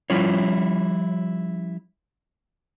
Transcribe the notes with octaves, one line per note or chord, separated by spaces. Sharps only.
F3 G3 C#4 E4 F4 C#5